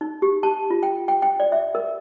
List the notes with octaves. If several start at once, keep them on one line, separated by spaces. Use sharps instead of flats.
D#4
G4
A5
F4
G5
G5
G5
D5
E5
A#4